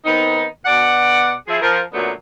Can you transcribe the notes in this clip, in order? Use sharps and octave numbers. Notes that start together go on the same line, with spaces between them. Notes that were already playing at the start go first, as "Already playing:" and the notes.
D#3 B3 C4 D#4
B2 D5 F#5
F3 E4 G#4
F3 A#4
F#2 A#2 D3 F#3 A3 B3